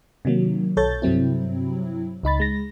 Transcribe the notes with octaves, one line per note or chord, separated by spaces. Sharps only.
C3 D#3 F#3 A#3
B1 A4 C#5 G6 A6
G2 C3 F#3 C4 E4
C#2 D#4 B5 A6
G#3 A#6